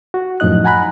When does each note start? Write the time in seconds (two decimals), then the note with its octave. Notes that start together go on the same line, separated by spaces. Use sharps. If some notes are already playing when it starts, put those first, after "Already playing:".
0.14 F#4
0.40 F#2 A2 F3 D#4 D#5 F#6
0.65 F#5 G#5 A#5 B5 F#6